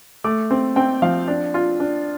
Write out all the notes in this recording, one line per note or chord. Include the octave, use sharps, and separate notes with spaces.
A3 D6
C4
C4 G5
F3 F5
D4
F4
D4